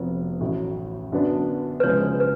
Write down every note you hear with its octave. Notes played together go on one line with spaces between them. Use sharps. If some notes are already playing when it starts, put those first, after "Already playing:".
Already playing: F1 F2 F3 B3 F#4
A1 A2 F#3
F#2 D3 F#3 B3 D4
B4
F#1 F#2 C#3 F3 G#3 C#5
B4